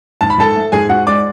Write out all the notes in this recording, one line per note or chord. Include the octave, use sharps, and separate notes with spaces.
G#2 A5
B5
G#2 A4 A5
A3
G#2 G#4 G#5
G#2 F#4 F#5
G#3 D5 D6